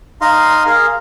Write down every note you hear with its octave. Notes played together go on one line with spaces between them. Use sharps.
D#4 D#5 F5 C6
G#4 A#4 F5